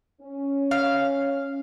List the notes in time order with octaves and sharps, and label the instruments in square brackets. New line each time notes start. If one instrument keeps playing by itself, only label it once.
[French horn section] C#4
[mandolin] F5